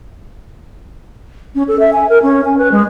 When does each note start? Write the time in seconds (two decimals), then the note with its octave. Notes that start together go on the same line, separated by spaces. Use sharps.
1.55 C#4
1.68 A4
1.79 E5
1.93 G#5
2.09 A#4
2.23 C#4
2.45 G#5
2.58 B4
2.72 G#3